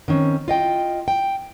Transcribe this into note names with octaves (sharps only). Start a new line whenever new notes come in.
D#3 C4 C#4
F4 D#5 G5
G5